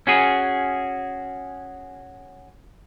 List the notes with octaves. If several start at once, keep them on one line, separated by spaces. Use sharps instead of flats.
C#4 F#4 G#4